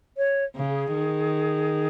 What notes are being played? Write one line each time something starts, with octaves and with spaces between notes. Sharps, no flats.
C#5
C#3
G#4
D#3